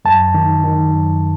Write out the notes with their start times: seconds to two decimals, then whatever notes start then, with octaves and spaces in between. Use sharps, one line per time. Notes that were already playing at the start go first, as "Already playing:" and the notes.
0.05 F#2 A5
0.34 D#3
0.64 D#3
0.93 F#2